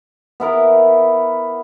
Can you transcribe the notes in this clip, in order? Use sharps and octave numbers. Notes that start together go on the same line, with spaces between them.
B3 E4 A#4